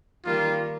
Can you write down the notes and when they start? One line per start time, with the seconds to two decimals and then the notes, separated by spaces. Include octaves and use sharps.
0.24 D#3 G3 A#3 F4